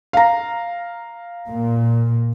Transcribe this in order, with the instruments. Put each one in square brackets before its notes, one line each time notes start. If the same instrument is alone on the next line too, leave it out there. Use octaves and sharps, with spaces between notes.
[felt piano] F5 A#5
[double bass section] A#2